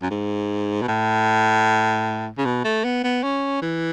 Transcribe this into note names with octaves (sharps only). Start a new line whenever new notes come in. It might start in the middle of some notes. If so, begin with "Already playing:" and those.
F#2
G#2
B2
A2
C#3
B2
A3
B3
B3
C#4
E3